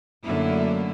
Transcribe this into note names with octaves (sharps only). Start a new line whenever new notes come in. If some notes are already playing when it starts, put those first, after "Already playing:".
F#2 D3 A3 A#3 E4